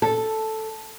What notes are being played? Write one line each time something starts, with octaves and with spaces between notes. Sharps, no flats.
A4